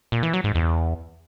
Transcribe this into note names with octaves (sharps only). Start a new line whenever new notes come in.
A#2
E3
F#3
G#2
E2